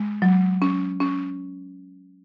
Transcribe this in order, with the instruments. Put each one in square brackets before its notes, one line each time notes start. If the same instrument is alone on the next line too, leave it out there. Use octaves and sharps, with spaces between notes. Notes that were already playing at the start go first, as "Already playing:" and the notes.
Already playing: [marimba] G#3
F#3
C#4
C#4